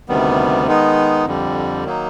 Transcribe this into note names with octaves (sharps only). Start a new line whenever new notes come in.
D2 C3 D#3 G3 B3
D#3 G#3 B3 D#4
F2 D3 G3
D#3 F#3 A#3 D#4